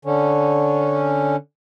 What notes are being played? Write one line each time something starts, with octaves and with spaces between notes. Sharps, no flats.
D3 C#4